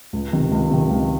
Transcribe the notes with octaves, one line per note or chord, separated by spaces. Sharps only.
C#2
C3 D#3
C#2
C3 D#3
C#2